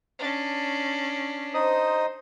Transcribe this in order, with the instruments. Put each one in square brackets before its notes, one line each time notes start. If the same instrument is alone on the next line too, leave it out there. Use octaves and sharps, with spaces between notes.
[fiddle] C#4 D4
[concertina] D#4 D#5 D#6 [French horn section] C5